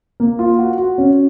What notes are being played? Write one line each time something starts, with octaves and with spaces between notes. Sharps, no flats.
A#3
F4
F#4
F#4
C#4